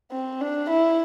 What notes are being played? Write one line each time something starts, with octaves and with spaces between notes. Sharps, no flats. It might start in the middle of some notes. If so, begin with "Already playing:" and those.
C4
D4
E4